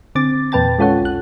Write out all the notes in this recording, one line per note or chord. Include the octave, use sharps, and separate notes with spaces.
D3 C4 D6 A6
E2 A#2 B4 G5 A5 A6
G#3 C#4 F4 A4 C#5 F#5
A#1 F#6